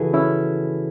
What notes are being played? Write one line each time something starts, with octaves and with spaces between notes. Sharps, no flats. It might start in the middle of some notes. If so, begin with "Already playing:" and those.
Already playing: C#3 E3 E4 F#4 G#4 A4 B4
C#4 E4